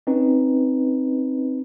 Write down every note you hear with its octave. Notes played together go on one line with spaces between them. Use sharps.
C4 C#4 D#4 B4